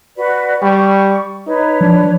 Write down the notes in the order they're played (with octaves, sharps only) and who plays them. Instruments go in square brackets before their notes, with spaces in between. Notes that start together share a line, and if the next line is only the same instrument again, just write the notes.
[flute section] F#4 B4 D5
[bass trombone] G3 [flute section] C#6
[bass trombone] D#4 [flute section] B4 C#5
[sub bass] F3 [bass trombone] D4